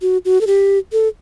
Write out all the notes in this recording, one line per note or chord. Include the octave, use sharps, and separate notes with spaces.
F#4
F#4
A4
G4
A4